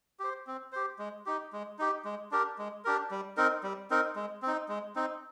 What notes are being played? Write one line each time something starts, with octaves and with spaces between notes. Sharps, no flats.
G4 C5
C4
G4 C5
G#3
D#4 G4
G#3
D#4 G4
G#3
D4 G4 A#4
G#3
D4 G4 A#4
G3
C4 D#4 A#4
G3
C4 D#4 A#4
G#3
C4 D#4
G#3
C4 D#4